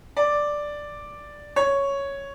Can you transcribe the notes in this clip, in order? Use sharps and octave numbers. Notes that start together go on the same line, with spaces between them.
D5
C#5